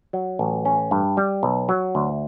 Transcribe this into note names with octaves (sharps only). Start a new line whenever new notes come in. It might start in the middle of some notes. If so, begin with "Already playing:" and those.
F#3
A1
C#4
G2
G3
B1
F#3
D2